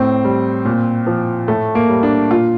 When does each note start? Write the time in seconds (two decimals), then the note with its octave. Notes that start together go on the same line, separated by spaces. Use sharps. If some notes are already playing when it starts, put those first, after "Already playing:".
Already playing: A2 C4
0.25 G3
0.65 A#2
1.07 F3
1.48 A2 A3
1.75 A#3
1.89 G3
2.03 D4
2.31 A#2 F4